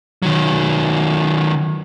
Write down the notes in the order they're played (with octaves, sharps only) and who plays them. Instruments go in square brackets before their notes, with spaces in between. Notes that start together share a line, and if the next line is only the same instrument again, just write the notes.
[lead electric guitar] D#3 F#3